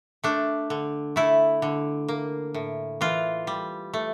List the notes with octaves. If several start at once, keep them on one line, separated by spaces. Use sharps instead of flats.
A3 D4
D3
A3 E4
D3
A#3
A2
E3 F4
G3
A3